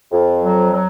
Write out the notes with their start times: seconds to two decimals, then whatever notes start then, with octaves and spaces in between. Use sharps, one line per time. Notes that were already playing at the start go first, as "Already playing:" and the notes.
0.12 F2
0.43 F#3
0.73 F#3